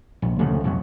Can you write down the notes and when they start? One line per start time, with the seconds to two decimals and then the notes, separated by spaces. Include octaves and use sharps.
0.22 A#1
0.39 D2 C#3 F3 A3
0.64 C2 F2 B2 F#3